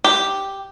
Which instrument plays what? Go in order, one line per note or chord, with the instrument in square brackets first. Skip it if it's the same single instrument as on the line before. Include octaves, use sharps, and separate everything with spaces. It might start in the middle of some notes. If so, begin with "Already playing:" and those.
[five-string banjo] G4